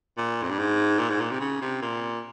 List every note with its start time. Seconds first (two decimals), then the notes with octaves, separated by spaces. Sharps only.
0.17 A#2
0.43 F2
0.50 G2
0.59 G#2
0.99 A#2
1.10 G#2
1.20 A#2
1.31 C3
1.40 C#3
1.61 C3
1.82 A#2